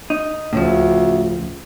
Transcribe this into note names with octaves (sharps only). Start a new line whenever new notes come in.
D#4
D2 A2 C#3 F3